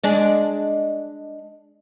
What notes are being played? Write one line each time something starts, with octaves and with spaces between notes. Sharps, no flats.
G#3 D4